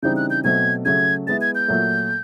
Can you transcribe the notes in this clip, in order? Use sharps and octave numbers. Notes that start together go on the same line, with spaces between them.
C#3 E3 G3 C4 D#4 G6
F#6
G6
B2 F#3 A3 C4 G#6
C#3 F#3 A3 G#6
G#3 B3 E4 A6
G#6
G6
A#2 F#3 A3